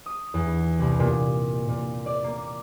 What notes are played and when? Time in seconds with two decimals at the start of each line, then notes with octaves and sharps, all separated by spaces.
0.06 D#6
0.34 E2
0.79 C2
1.00 A#2
1.69 A#2
2.06 D5
2.24 A#3